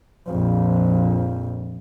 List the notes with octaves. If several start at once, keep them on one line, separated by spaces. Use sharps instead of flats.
A#1 F2